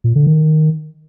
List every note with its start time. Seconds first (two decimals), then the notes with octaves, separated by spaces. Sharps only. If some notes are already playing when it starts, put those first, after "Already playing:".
0.04 A#2
0.15 D3
0.27 D#3